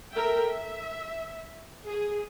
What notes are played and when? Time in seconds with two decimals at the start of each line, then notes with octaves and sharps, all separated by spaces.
0.13 A4 A#4 E5 G5
0.48 E5
1.87 G#4